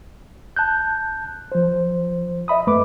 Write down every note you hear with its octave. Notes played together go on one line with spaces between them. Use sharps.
A5 F#6 G6
F3 C5
D#5 E5 B5 D#6
F#2 A3 B4 B5 D6